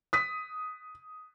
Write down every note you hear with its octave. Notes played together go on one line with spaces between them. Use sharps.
D#6 B6